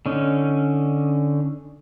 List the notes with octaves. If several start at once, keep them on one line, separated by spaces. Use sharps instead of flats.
D3 C#4 D#4